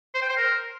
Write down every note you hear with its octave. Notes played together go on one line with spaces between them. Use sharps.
C5
G5
C5
A#4